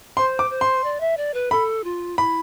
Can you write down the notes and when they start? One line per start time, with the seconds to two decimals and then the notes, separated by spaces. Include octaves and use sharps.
0.17 C5 C6
0.39 D6
0.50 C5
0.61 C6
0.84 D5
1.00 E5
1.17 D5
1.34 B4
1.51 A4 B5
1.84 F4
2.18 E4 B5